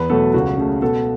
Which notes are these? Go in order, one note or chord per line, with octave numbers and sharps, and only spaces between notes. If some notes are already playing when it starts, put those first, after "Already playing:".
Already playing: E2 B4
B2 F#3 A3 A4
C#2 F#4
C#3 A3
B2 A4